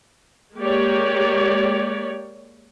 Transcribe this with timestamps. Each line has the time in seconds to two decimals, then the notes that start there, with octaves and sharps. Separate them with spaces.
0.57 G#3 A#3 G4 C#5 D5